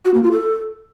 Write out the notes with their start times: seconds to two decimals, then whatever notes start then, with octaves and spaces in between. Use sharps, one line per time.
0.05 F#4
0.14 A#3
0.23 F4
0.32 A4